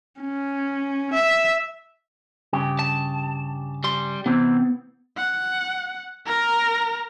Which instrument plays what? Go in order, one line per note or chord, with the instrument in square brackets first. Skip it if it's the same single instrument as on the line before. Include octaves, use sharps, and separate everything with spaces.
[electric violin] C#4
E5
[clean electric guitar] G2 C#3 G4
[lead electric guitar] A5
G3 C6
[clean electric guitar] C3 E3 C4 [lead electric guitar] B3
[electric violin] F#5
A#4 A#5